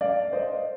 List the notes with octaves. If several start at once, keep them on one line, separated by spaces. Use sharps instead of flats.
D5 F5
C5 D#5